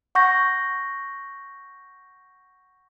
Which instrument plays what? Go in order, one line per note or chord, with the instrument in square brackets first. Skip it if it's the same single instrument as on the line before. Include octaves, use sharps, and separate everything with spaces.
[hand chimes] F#5 C#6 G6 A#6